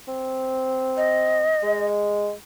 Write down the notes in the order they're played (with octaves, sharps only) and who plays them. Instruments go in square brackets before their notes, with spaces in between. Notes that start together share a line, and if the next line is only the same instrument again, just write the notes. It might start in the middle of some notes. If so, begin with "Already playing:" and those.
[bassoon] C4
[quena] D#5
[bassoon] G#3